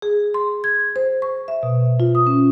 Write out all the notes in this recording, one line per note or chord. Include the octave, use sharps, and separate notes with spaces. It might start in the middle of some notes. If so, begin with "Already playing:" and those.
G#4
C6
G#6
C5
C#6
E5
B2
F4
D#6
C#4